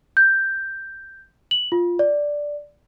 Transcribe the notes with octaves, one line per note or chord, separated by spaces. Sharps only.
G6
F#7
F4
D5